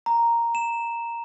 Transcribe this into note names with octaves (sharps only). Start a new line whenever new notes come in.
A#5
E7